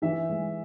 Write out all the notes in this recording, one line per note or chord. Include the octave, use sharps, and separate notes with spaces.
E3 E5
G#3